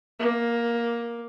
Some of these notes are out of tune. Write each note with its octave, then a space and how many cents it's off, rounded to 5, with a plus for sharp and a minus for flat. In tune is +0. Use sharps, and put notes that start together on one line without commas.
A#3 +10